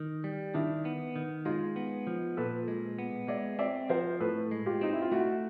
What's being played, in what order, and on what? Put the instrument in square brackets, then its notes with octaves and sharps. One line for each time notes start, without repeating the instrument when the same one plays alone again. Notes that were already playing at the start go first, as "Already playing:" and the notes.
Already playing: [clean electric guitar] D#3
G3
[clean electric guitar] D#3 [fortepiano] D4 E4
[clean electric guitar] B3
D#3
[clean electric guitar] G#3 [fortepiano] D#4 F4
[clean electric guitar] B3
F3
[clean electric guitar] A#2 [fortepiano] A4 B4
[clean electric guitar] G#3
B3
[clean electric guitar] G#3 [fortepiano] D5 E5
[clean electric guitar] C4 [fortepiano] D5 E5
[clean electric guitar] F3 [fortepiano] A#4 C5
[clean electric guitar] A2 [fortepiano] A4 B4
[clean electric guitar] G#3
[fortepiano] F4 G4
[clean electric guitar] C4 [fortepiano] D#4
[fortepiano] E4
F4
[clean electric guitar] A3 [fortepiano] E4 F#4